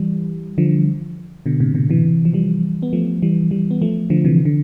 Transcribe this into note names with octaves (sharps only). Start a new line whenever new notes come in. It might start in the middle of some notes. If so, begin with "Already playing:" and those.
Already playing: E3 G3
D3 F3
B2 D3
A2 C3
B2 D3
C3 E3
F3
E3 G3
B3
F3 A3
E3 G3
E3 G3
B3
F3 A3
D3 F3
C3 E3
D3